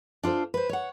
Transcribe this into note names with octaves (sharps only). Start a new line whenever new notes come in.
D4 F4 A4 C5
B4 C5
C#5 F#5